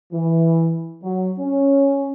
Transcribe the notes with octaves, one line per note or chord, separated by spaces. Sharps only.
E3
F#3
C#4